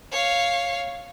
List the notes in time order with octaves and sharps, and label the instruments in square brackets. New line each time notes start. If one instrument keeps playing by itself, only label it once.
[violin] C#5 F5